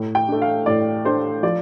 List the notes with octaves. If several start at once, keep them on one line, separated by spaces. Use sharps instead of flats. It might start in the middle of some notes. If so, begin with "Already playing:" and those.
Already playing: A2
G5
A3 D4
F5
A2 D5
A3 D4 C5
F3 D5